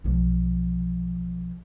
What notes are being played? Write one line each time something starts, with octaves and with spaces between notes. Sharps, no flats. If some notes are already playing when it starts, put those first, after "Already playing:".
B1 F3